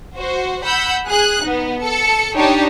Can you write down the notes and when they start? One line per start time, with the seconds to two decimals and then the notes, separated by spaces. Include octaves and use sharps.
0.17 F#4 C5
0.64 F#5 B5 E6 G6
1.07 G#4 F#6
1.44 B3 D#4
1.81 A4 C#7
2.37 D4 D#4 G4 C#5 A5